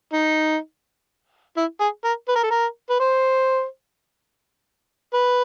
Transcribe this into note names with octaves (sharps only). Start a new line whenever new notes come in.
D#4
E4
G#4
A#4
B4
A#4
A4
A#4
B4
C5
B4